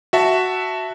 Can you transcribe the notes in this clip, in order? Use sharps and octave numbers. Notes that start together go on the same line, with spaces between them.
F#4 E5 A5